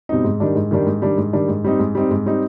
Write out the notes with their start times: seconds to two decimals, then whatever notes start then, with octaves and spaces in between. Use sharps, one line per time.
0.09 B2 G3 C4 D#4
0.25 G#2
0.40 D#3 G3 D4
0.56 G#2
0.71 D#3 G3 D4
0.87 G#2
1.02 D#3 G3 D4
1.18 G#2
1.33 D#3 G3 D4
1.48 G#2
1.64 G3 C4 D#4
1.80 G#2
1.95 G3 C4 D#4
2.11 G#2
2.26 G3 C4 D#4